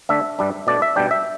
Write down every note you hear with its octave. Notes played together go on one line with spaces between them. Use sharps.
D3 A3 D4 E5
G2 G3 D4
B2 A3 D4 D5
E5
B2 G3 D4 G5
E5